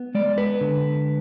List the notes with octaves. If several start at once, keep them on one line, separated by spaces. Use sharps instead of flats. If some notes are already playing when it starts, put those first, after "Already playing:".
Already playing: B3
G#3 D5
B4
D3